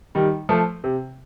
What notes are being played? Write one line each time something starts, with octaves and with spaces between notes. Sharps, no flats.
D#3 G3
F3 A3
C3